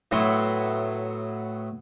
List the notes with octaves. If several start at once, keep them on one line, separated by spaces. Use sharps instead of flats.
A2 F#3 B3 E4 C6